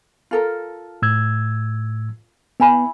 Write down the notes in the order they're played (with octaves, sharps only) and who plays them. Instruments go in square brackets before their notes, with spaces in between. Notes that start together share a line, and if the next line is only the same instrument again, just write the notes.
[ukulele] F4 A4 A#4
[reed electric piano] A2 E6 G#6
[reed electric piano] B3 [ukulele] E4 G#5 B5